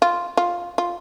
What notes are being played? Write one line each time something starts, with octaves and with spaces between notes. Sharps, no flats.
F4
F4
F4